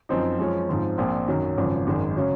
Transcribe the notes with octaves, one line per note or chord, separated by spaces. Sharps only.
F#2 F3 C4 D#4
F#2 F3 G#3 C#4
G#2 F3 C4
A#1 A#2 F3 C4
F#2 D#3 F#3
G#1 F#2 C#3 F3
G#1 F#2 D#3 G#3
C#3 F#3 C#4